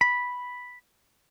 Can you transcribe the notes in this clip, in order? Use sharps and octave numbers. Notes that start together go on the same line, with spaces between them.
B5